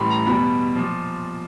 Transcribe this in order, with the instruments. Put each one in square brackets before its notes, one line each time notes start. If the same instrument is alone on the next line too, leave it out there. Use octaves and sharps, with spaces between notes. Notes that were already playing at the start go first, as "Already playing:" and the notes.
Already playing: [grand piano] A1 A2 E3 G3 B5 C6
A#5
E2 B2 G3 B5
A#2 F3